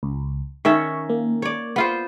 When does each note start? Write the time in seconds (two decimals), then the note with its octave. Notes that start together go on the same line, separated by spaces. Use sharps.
0.03 C#2
0.65 D#3 C#4 E5 C#6
1.09 A#3
1.42 C#5 D5
1.76 B3 F4 C5